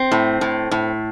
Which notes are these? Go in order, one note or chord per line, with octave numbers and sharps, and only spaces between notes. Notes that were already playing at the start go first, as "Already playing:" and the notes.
Already playing: C4
A2
A2
A2